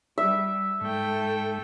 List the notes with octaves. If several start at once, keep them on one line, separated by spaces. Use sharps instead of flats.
G3 E5
G#2 A3 A4 G5